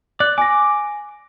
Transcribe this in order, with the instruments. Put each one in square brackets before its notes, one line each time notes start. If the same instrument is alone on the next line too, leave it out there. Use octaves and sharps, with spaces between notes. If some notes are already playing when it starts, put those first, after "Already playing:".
[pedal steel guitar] D5 [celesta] F#6
[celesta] G#5 A#6 [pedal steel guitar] D6